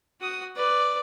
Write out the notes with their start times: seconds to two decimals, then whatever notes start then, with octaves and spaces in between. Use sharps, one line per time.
0.21 F#4 D#6
0.56 B4 D5